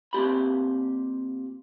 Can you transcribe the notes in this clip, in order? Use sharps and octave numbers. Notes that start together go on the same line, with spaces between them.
A#2 C4 G4 B5